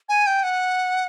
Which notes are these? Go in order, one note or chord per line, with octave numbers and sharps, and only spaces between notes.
G#5
G5
F#5